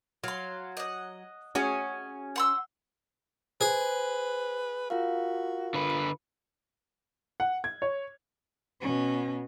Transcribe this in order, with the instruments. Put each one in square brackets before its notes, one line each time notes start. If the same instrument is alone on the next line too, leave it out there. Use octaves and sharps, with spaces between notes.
[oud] F#3 [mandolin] F5 C6
[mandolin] D#5 F#5
[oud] C#4 F#4 G#4
[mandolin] F#5 C6 E6
[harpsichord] G#4 [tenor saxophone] B4 [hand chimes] C5
[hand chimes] F4 A#4 F5 [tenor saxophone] F#4
[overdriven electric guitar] D3 B4
[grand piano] F#5
G#6
C#5
[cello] B2 C#4